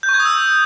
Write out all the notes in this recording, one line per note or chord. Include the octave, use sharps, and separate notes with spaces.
G6
C#6
G#6
D#6
E6